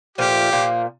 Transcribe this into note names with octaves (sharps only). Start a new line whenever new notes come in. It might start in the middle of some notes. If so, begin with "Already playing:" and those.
A#2 F3 A3 G4
A#2 F3 A#3